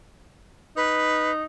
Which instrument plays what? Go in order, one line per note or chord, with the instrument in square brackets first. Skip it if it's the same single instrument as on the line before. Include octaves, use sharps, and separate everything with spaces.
[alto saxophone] D#4 [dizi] B4